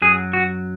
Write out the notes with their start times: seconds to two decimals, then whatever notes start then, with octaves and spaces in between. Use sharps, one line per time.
0.02 F#2 F#3 G#4
0.33 F#4